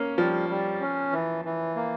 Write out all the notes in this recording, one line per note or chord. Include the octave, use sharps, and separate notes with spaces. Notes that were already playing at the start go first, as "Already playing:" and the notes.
Already playing: A#3 C#4
F3 G3
G3
C#4
E3
E3
A#3